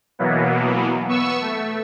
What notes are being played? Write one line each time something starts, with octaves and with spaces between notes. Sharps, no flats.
B2 E3 F#3 A#3 B3
B3 C#6 E6
A3